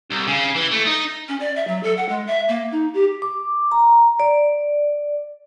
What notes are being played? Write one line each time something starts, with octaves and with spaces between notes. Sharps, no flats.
C2
C#3
E3
A3
D#4
C#4
D5
E5
F#3
A4
F#5
G#3
E5
A#3
D#4
G4
D6
A#5
D5